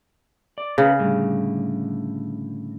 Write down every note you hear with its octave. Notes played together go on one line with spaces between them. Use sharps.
D5
C#3 C#4 A#4 B4
A2 D3 G3